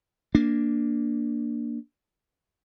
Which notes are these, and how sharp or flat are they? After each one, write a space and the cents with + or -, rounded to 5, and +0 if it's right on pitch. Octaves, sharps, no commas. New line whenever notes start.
A#3 +0 D4 +0